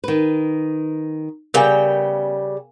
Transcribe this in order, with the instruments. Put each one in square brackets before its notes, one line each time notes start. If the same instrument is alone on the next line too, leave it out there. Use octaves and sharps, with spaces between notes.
[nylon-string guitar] D#3 B4
[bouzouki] C#3 G3 G5 [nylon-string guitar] B3 [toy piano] A#4 F5 G#5